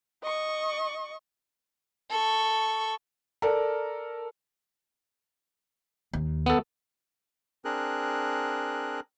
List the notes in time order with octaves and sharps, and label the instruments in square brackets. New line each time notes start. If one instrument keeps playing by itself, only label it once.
[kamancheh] D#5 C#6
[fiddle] A4 C#6
[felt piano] A4 A#4 D5
[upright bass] D#2
[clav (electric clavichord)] B3 A4
[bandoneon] C4 D4 G#4 A#4 F#6